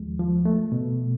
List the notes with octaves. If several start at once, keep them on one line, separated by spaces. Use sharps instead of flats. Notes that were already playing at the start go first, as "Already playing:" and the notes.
Already playing: D#2 F3 G#3
F3
A3
B2